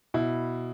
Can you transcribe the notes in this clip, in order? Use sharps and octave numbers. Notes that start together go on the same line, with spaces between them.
B2 E4